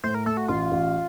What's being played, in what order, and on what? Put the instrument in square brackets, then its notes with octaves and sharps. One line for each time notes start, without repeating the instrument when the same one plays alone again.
[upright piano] A2 [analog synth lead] C5
[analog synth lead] A#4
[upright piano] A3 [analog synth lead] A4
[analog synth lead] F#4
[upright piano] A1 [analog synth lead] F4
[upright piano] A1